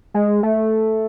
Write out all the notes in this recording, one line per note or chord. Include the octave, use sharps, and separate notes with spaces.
G#3
A3